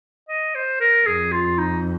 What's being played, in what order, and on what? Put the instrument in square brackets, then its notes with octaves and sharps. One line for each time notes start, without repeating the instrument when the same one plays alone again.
[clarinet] D#5
C5
A#4
[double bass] F2 [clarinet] G#4
[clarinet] F4
D#4